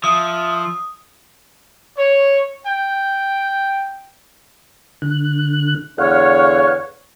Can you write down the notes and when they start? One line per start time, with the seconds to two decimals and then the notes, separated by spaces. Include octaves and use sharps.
0.04 F3 E5 D#6
1.96 C#5
2.65 G5
5.02 D3 F#6
5.98 E2 D3 C#5 F5 F#5